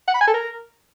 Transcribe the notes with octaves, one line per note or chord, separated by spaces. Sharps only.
F#5
B5
G#5
A4
A#4